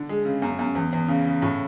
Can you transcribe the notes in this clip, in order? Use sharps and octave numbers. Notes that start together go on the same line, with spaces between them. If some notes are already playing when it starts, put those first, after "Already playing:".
Already playing: D3
G#3
C#3
F#2
F#2
E2
E2
C#3
C#3
A2